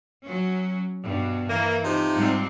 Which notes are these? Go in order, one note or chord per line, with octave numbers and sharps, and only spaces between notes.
F#3 C#4
G2 B2
E3 A#3
C3 F3 D#4
G#2 G3 C4